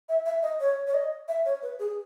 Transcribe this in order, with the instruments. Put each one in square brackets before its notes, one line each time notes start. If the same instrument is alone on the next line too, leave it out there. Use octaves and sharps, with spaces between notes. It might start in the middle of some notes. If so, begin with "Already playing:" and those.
[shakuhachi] E5
E5
D#5
C#5
C#5
D#5
E5
C#5
B4
G#4